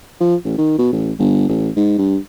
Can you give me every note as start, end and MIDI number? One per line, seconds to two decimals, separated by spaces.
0.21 0.35 53
0.45 0.56 33
0.58 0.74 51
0.79 0.90 47
0.93 1.12 33
1.19 1.49 31
1.49 1.70 33
1.76 1.95 44
1.99 2.16 43